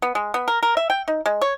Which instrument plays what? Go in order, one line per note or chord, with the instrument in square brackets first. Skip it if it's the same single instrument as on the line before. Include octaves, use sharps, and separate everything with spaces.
[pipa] B3
G#3
B3
A#4
A#4
E5
G5
D#4
G#3
C#5